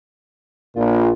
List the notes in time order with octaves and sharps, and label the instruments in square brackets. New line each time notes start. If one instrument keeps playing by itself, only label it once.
[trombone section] A#1 A#2 [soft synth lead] F4